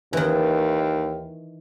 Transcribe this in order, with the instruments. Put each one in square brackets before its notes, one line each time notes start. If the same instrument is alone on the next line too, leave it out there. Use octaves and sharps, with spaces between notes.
[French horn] D#2 [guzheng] D#3 E3